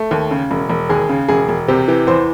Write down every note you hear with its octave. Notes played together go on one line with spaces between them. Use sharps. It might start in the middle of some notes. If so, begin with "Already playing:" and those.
Already playing: A3
D#2
C#3
E1
E1
D#2 G#4
C#3
E1 G#4
E1
C3 G4
E3 G4
E2 C5